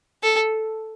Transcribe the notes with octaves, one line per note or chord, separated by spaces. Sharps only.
A4